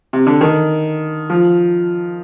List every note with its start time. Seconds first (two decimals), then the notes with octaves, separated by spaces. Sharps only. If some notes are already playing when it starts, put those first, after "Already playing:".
0.13 C3
0.27 D3
0.41 D#3
1.30 F3